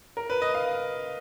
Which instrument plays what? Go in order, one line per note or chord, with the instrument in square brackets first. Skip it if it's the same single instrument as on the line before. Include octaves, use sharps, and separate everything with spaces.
[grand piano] A#4
B4
D#5
F5